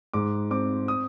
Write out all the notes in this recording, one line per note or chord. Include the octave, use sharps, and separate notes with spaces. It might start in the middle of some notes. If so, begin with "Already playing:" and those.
G#2 D6
C4 D6
D#6